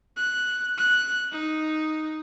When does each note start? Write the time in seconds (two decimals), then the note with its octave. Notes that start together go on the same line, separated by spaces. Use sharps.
0.17 F#6
0.78 F#6
1.32 D#4